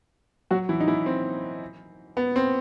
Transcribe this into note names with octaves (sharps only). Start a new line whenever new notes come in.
F#3 F#4
E3 E4
D#4
E3 E4
C4
B3
C4